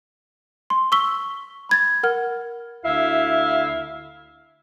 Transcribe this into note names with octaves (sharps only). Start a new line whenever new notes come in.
C6
C#6 E6 B6 G7
B5 G#6 A6
A#4 F#5 F6
D2 E4 E5 F5